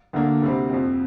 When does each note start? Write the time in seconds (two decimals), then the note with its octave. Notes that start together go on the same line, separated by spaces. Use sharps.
0.13 D2 D3 A#3 D4
0.42 D2 C3 G3 C4
0.70 F2 F3 C4